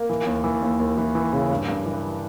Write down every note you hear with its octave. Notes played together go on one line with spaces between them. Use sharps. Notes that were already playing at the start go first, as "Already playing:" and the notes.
Already playing: A#3
E3
D#2
E3
D#2
D#2
E3
E3
C#3
G2
G2
E3